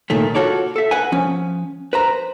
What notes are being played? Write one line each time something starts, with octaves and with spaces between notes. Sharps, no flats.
C#2 A#2 D#3 A3
F4 F#4 A4 C#5 D5
A4 E5
B4 D#5 F#5 G#5
F3 C#4
B4 C5 A#5